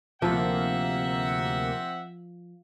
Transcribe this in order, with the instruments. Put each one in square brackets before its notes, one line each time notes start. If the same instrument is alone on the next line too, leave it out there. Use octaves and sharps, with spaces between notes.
[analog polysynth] D2 C3 A#3 [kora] F3 [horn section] C4 E5 F#5